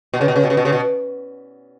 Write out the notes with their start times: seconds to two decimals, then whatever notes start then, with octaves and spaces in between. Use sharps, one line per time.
0.14 B2
0.21 C#3
0.28 B2
0.36 C#3
0.44 B2
0.50 C#3
0.57 B2
0.65 C#3
0.72 B2